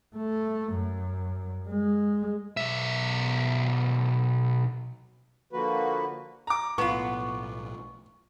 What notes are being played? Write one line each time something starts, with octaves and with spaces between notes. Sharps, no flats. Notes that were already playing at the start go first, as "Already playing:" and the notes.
A3
F#2
G#3
B1 E5
D3 F3 A#3 F#4 B4
A#5 D6
B1 A2 B3 F4 C#6